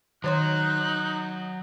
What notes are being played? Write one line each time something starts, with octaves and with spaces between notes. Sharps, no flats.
D#3 F#3 D#4 C#5 C6 F#6